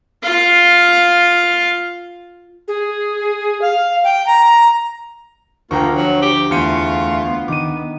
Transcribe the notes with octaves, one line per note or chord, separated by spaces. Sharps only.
F4 F5
G#4
F5
G5
A#5
D2 A#3 F4 G5 A#5 C#6
F3 F#3
G4
E2 A3 F4 C#7 D#7
B3
D#3 D6 D#7